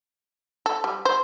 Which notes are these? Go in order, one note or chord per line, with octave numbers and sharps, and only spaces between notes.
A4
G3
C5